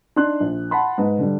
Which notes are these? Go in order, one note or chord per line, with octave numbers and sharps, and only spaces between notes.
D4 D#4 C6 F#6
A#1
F#5 A5 B5 C6
G#2 B4
D3 G3